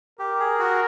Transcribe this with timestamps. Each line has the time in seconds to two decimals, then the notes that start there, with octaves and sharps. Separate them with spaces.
0.19 G4 A#4
0.40 G#4
0.59 F#4